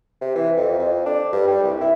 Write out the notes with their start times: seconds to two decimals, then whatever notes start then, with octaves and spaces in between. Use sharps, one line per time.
0.21 C3
0.35 E3
0.57 F2
0.79 F2
1.06 D4
1.33 G2
1.47 G3
1.64 C2
1.81 E4